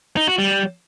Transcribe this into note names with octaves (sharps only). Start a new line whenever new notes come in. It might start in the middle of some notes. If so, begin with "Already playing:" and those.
D#4
F#4
G3